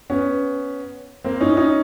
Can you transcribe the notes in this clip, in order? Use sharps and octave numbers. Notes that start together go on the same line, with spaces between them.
B3 C#4
A#3 C4
C#4 D#4
E4
C#4 D#4